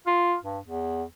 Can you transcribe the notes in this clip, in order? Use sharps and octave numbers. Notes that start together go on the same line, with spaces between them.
F4
G2
E2